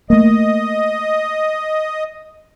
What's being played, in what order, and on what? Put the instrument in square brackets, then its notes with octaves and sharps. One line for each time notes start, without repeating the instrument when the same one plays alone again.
[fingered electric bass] A3 A#3 [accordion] D#5